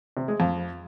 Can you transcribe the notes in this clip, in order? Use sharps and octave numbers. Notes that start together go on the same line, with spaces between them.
C3
G#3
F2